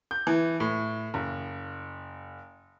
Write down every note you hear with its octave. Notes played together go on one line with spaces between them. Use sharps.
G6
E3
A2
F#1